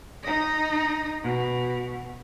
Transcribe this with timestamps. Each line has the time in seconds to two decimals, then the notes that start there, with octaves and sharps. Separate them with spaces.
0.24 D#4 D#5
1.23 B2